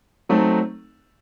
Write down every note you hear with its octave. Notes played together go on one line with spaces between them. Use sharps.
F#3 A3 C4 D#4 A4